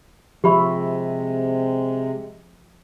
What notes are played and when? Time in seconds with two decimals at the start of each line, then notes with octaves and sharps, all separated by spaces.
0.44 C3 F3 G#3 G4 E5 B5 C#6